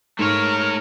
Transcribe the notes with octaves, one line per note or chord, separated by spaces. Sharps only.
G#2 A3 A#3 A#4 C#5